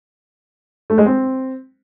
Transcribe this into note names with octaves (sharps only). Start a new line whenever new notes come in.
A3
G#3
C4